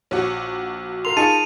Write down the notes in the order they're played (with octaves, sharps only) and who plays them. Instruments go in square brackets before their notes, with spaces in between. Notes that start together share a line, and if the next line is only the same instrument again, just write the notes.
[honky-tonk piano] A#1 F#4 [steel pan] C#5
[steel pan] A#4 C6 [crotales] F7
[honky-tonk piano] D#4 F4 [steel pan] G#4 C#6 [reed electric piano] A5 [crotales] D#7